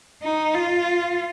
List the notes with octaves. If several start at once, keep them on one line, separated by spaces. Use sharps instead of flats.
D#4
F4